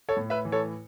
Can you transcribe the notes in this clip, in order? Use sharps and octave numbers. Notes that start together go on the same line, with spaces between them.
A4 C#5
A2
B4 E5
E3
A4 C#5